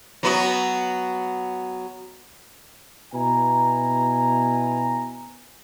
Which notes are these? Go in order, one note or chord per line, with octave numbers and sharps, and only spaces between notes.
F#3 B3 F#4
B2 E4 B4 G#5 A#5